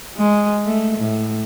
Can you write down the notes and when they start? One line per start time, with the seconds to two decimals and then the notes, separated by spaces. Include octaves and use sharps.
0.17 G#3
0.65 A3
0.98 A2